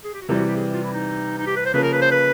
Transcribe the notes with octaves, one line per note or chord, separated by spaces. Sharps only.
G#4
G4
F#4
C3 E3 G3 F4
F#4
G4
G#4
F4
E4
D#4
D#4
G4
B4
C5
C#3 F3 A#3 B4
A#4
B4
C5
B4